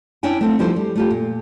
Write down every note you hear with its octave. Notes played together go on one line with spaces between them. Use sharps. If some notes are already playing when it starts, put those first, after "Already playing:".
C#4 D4 E4 C#5 G5 G#5
A3 C4 D#4
F3 G3 A3 E4 A4 C5
G3
A3 F4 G4
A#2